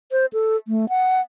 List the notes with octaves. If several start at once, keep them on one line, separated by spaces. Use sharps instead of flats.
C5
A4
A3
F#5